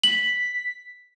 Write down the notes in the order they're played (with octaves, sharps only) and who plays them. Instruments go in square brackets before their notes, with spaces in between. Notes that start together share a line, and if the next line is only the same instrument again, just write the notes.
[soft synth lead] B6 [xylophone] F#7